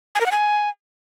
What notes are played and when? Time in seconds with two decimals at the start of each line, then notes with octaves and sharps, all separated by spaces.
0.15 G#5
0.21 A#4
0.26 F#5
0.31 G#5